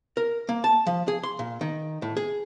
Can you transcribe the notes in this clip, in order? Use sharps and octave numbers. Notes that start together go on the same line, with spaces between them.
A#4
A#3
A5
F3
G#4
C6
A#2
D#3
A2
G#4